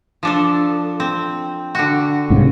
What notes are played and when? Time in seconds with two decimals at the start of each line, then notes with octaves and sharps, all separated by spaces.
0.23 F3 D4 A4
1.00 C4
1.75 D3 F#4
2.30 C2 G#2 C#3